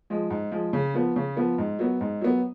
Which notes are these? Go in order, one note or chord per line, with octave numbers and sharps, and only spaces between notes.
F3 G#3
G#2
F3 G#3
C#3
F3 B3
C#3
F3 B3
G#2
F#3 B3
G#2
F#3 B3